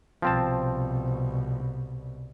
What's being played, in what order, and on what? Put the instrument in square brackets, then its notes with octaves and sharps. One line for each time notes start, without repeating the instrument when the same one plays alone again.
[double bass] C2 B2 [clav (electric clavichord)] F3 C4 A5